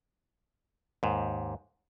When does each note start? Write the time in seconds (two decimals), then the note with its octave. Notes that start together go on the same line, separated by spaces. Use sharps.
1.03 D#2 G#2